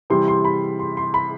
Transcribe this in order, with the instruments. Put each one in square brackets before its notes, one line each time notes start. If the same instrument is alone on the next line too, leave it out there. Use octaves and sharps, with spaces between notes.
[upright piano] C3 E3 G3 C6
C6
B5
C6
C6
B5